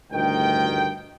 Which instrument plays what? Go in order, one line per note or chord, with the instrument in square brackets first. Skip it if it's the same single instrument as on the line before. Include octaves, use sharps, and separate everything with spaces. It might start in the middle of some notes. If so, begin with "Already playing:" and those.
[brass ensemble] A1 D2 G2 D#3 G5